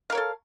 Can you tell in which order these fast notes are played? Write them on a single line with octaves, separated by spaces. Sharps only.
F5 A#4 C#5 A4